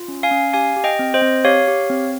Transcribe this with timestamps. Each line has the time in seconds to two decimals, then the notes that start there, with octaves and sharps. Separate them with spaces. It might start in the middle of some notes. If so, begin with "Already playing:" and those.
Already playing: F4
0.08 C#4
0.23 F5 G#5
0.31 C#4
0.53 G4 F5 G#5
0.76 G4
0.84 D#5 G5
0.99 C4
1.14 C5 D#5
1.22 C4
1.45 G4 C#5 F5
1.68 G4
1.90 C4